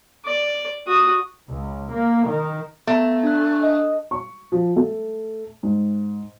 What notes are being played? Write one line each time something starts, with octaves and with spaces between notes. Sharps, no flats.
D5
F#4 D#6
C#2
A#3
D#3
A3 B3 A#5
D4 F#6
D#5
C#6
F3
A3
G#2